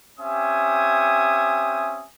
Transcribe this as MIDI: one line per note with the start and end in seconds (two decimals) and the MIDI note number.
0.19 2.04 60
0.19 2.04 61
0.19 2.04 67
0.19 2.04 76
0.19 2.04 80
0.19 2.04 87